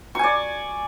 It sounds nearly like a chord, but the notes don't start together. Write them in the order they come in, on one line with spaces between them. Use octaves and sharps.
C#6 G#5 D5